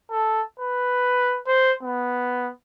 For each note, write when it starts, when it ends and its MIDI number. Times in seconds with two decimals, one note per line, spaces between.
0.11 0.42 69
0.60 1.40 71
1.47 1.72 72
1.83 2.50 59